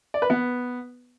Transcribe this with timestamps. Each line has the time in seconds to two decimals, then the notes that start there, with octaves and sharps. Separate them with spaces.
0.14 D5
0.22 B4
0.30 B3